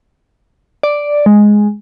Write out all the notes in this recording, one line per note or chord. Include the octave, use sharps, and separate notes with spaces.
D5
G#3